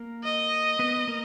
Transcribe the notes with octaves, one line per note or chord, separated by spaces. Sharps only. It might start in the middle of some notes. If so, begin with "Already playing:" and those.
Already playing: A#3 A#4
D#5
B3 B4
A#3 A#4